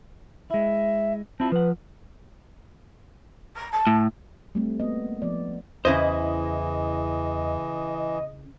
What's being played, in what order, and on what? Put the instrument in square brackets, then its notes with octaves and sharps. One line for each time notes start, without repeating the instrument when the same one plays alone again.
[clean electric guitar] G#3 E4 [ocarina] E5
[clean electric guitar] C4 E4 F4 [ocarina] A5
[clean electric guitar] F3 F#5 [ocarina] B4
[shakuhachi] A#5
A5
[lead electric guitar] A2
[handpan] G3 A3 C4
A#3 B3 D#5
F3 B3 D5
[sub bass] E2 [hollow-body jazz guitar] C#3 E4 C5 [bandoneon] E3 [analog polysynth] D#5